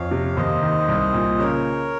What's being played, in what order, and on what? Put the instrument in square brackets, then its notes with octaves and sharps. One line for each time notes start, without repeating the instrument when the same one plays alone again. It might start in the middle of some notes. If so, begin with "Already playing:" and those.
Already playing: [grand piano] F2 [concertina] C#5 F5
[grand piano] C3
[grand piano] D#2 [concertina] C5 D#5
[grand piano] D#3
C2
A#2
[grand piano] C#3 [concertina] A#4 C#5